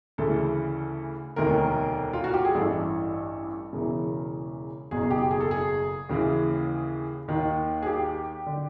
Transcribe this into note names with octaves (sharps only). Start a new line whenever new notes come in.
D2 C#3 E3 A4
E1 D2 C3 D#3 A#4
F4
F#4
G4
G#4
A1 G2 E3 A4
E1 E2 C#3 E3
F#1 E2 B2 G#4
G#4
G4
G#4
A4
G#4
D#2 C#3 E3
D#2 D#3
G#4
G4
D3